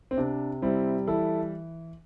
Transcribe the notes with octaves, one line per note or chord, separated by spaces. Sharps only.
C4
C3 D4
G3 C4 E4
E3 E4 A4